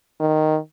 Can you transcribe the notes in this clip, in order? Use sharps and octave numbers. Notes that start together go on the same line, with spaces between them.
D#3